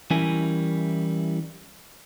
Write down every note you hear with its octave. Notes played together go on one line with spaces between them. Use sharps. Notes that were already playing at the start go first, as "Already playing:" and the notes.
E3 G3 C#4 E4 A#4 G#5